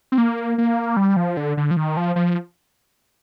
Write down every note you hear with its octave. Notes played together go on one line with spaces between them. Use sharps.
C4
A#3
A#3
G3
F3
D3
D3
F3
D#3
F3
F3